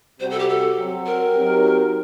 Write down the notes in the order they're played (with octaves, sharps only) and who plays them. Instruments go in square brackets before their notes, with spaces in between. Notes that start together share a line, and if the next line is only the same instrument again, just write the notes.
[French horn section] C3 G3 C4 F#4 [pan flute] C5
[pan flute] A4
G4
A4
[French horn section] F#3 C4 F#4
[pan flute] A#4
[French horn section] F#3 C4 D#4 G4